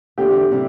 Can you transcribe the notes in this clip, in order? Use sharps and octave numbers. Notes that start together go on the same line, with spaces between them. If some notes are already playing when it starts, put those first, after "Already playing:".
E2 D3 C4 G4 A4
C3 G3 C4 E4